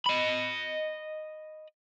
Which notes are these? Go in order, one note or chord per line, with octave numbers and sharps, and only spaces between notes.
D#5 B5